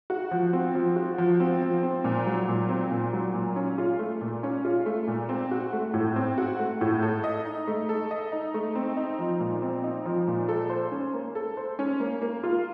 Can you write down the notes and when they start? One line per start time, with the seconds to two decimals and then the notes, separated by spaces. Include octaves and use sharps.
0.10 F#4
0.31 F3
0.53 C4
0.75 F3
0.96 F#4
1.18 F3
1.40 C4
1.62 F3
1.83 C4
2.04 A#2
2.26 F#3
2.48 A#2
2.69 C4
2.91 A#2
3.13 F#3
3.34 A#2
3.56 C#4
3.78 F4
3.99 A3
4.21 A#2
4.43 C#4
4.65 F4
4.86 A3
5.07 A#2
5.29 C4
5.51 F#4
5.73 A3
5.94 A2
6.16 C4
6.38 F#4
6.59 A3
6.81 A2
7.03 A4
7.24 D#5
7.45 D#4
7.67 A3
7.89 A4
8.11 D#5
8.32 D#4
8.54 A3
8.75 C4
8.97 D#4
9.19 F3
9.40 A#2
9.62 C4
9.84 D#4
10.05 F3
10.27 A#2
10.49 A4
10.70 C5
10.92 C#4
11.14 A#3
11.35 A4
11.57 C5
11.79 C#4
12.00 A#3
12.22 A#3
12.44 F4